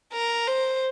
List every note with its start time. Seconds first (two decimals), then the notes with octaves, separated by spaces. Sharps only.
0.13 A#4
0.48 C5